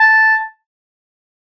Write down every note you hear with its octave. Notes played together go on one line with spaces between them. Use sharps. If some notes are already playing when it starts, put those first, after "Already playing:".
Already playing: A5